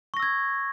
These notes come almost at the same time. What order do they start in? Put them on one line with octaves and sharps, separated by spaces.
C#6 A#6 E6 G#6